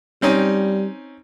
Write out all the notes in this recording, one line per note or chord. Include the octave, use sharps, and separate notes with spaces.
G3 C4 C#4 D#4